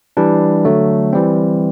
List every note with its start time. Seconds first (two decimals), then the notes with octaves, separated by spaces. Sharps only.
0.17 E3 G3 D4
0.65 D3 F#3 A3
1.13 E3 G3 C4